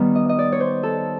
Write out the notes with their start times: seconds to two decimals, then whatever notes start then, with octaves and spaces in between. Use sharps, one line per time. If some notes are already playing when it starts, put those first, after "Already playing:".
Already playing: D#3 G3 B3
0.15 D#5
0.29 D#5
0.39 D5
0.52 C#5
0.60 C5
0.83 A4